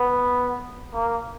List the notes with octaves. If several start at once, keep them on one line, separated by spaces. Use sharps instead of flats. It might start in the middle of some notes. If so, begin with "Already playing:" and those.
Already playing: B3
A#3